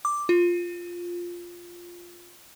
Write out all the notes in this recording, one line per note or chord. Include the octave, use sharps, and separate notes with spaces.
D6
F4